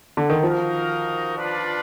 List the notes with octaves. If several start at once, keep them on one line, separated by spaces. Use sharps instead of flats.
D3
D#3
F3 D#4 F#4 A#4 F5
D4 F4 B4 D5 F5